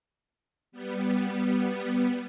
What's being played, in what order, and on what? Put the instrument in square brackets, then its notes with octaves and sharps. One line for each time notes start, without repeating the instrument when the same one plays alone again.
[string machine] G3 B3